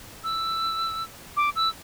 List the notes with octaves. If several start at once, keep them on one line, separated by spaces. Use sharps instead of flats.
E6
D6
E6